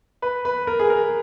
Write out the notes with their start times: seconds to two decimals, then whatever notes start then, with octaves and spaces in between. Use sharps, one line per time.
0.22 B4
0.45 B4
0.67 A#4
0.79 G#4
0.90 A#4